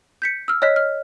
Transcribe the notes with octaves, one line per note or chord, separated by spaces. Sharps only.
G6 B6 C#7
E6 F6
C#5 D#5 F6 F#6 B6
F6